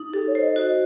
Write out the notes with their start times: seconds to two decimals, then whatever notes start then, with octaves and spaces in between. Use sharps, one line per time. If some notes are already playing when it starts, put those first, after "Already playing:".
Already playing: D#4
0.13 G4 A4
0.28 C#5
0.35 C5
0.42 D#5
0.56 F#4